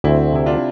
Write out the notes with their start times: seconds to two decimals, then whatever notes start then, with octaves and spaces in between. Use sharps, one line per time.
0.04 D2 C4 E4
0.33 C3 E4
0.46 D4 F4